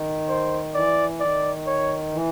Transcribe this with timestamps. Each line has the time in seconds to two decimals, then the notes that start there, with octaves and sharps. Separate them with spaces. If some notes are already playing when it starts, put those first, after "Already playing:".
Already playing: D#3
0.29 C5
0.74 E3 D5
1.20 D#3 D5
1.66 C#5
2.12 E3